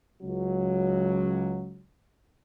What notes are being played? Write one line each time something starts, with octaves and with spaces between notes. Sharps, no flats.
C#2 F#3